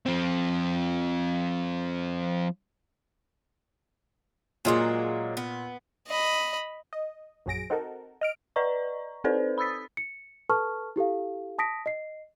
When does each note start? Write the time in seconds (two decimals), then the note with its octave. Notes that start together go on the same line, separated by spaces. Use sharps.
0.06 F3 C4
4.65 A#2 F#3 G#3 A#3 F4 C6
5.37 B3
6.08 D#5 B5
6.93 D#5
7.46 A#1 F#2 F#3 G#4 A#6 D7
7.70 C4 D#4 F#4 A4 A#4
8.21 D#5 F6 D7
8.56 B4 D5 D#5 A#5 C#6
9.24 C4 D#4 A4 B4 C5 D5
9.58 B5 D#6 E6 A6 B6
9.97 C#7
10.49 A4 B4 A5 C#6 F6
10.96 E4 G4 A4 F5
11.58 A5 D#6 A#6 B6 D7
11.86 D#5 C7